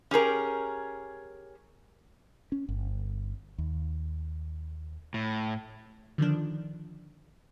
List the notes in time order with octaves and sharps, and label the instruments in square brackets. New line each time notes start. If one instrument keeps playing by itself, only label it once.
[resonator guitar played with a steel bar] C#4 G4 G#4 A#4
[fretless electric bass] C#4
G1
D#2
[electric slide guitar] A2
[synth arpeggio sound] D3 D#3 F3 D4